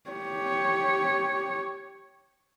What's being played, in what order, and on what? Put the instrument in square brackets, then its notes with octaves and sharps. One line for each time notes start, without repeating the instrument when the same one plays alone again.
[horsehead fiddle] G4 C#5